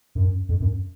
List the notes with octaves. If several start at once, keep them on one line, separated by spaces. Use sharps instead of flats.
F#2
F2
F#2